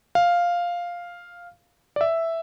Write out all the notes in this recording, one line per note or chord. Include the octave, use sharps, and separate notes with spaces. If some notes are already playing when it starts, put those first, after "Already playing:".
F5
D5
E5